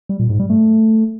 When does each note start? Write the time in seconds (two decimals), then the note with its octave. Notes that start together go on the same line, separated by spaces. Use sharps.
0.09 G3
0.19 A#2
0.30 G#2
0.40 G3
0.50 A3